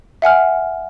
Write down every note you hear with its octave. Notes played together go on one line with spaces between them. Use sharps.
E5 F#5 G#5 F6